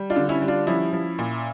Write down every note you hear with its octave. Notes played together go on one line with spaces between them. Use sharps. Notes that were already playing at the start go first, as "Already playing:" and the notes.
Already playing: G3
D4 F4
D3
C#4 E4
G3
D4 F4
F3 C#4 E4
F3
A#2